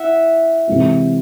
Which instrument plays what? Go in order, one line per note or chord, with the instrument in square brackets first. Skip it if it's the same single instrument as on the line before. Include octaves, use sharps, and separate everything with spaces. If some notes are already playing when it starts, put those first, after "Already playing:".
Already playing: [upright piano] E4 [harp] E5 F#5
[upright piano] C3 E3 G#3 C4 E4